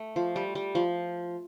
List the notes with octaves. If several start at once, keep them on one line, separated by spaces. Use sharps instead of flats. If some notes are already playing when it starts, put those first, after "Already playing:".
Already playing: A3
F3
G3
G3
F3